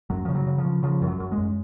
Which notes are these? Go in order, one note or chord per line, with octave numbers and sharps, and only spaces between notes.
F#2 F#3
C#3 F3
F#3
C#3
F3
C#3
C#3 F3
F#2
F#3
F#2
G#3
F#2